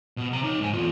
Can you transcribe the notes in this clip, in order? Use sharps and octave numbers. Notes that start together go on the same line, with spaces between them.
B2
C3 A#5
D#4 C#5
G#2 G#5
E2 F4